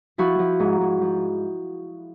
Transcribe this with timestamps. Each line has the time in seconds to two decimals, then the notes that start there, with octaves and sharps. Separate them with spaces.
0.18 F3 E4 F#4
0.39 F3
0.60 G#2
0.81 G#2
1.01 F3